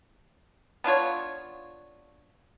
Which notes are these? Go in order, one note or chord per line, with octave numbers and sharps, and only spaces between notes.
B3 D4 F4 C#5